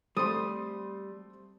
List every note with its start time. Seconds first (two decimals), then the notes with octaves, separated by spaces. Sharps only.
0.17 G3 A3 C4 C6 D#6